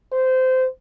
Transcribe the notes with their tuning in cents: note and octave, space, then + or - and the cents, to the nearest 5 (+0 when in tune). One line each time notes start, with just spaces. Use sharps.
C5 -20